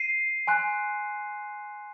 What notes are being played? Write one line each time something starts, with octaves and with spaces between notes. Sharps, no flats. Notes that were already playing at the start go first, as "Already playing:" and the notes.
Already playing: C7 D#7
G#5 C6 F#6